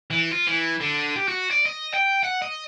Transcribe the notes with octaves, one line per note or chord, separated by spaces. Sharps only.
E3
F4
E3
D3
G4
F#4
D5
D#5
G5
F#5
D#5